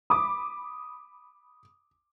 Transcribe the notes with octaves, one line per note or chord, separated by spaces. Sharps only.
B5 D6 D#6